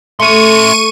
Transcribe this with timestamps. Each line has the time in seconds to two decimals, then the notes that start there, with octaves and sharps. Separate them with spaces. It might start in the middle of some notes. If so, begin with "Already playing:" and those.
0.20 A3 E5 C6 C#6 D#7